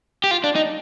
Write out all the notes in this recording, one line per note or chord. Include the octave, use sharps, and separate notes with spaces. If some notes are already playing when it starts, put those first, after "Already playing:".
G4
F4
D4
D#4